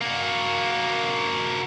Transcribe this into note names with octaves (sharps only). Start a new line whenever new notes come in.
A#3 F#4